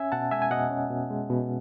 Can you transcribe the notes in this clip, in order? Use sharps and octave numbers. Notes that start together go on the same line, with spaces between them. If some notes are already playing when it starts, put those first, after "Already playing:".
Already playing: C#4 E5 G#5
B2 F#5 A5
G#3 E5 G#5
G#5
B2 D#5 F#5
C#4
B2
G#3
B2